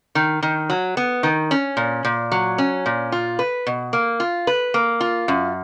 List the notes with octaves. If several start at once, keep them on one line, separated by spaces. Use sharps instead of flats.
D#3
D#3
F#3
B3
D#3
C#4
A#2
A#2
F#3
C#4
A#2
F4
B4
B2
A#3
F4
B4
A#3
F4
F#2